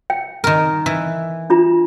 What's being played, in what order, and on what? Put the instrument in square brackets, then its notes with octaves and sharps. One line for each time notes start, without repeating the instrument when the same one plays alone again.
[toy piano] G5
[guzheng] D#3 A#4
E3
[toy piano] D4 F4 A#5